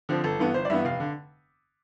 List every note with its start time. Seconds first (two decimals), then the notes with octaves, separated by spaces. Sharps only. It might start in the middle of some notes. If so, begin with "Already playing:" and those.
0.09 D3 F3 C4
0.24 G1 A4
0.39 G2 E3 B3
0.54 G1 C5
0.65 D5
0.70 G2 E3 B3 E5
0.85 F1 F5
1.00 D3